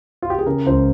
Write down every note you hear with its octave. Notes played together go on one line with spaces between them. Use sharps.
F4
G4
G#4
C#3 A#4
C#2 C5